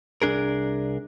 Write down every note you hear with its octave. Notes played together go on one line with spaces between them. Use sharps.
C2 C#3 D4 G#4 A#4